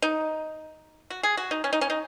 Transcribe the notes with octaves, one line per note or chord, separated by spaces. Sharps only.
D#4
F#4
G#4
F#4
D#4
C#4
D#4
C#4
D#4